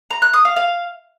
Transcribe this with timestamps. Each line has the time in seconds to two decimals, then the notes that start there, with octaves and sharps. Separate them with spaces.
0.11 A#5
0.22 F#6
0.33 D#6
0.45 F5
0.56 F5